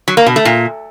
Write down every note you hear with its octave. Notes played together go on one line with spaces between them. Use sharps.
F#3
A#3
B2
A3
A#2